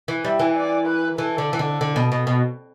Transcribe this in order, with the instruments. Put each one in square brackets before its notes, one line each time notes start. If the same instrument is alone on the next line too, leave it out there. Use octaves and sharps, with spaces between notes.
[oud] E3
[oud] G3 [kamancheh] E5
[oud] E3
[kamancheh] D5
B4
[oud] E3 [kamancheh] A4
[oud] D3
E3
D3
D3
B2
B2
B2